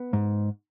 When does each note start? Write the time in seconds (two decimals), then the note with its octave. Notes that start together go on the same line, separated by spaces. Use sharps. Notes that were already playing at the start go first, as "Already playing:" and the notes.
Already playing: B3
0.13 G#2